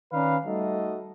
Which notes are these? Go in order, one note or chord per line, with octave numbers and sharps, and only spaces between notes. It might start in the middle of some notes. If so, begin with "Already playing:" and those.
D#3 C#4 B4 D5 F5 A#5
G3 A3 D#4 F#4 A4 D#5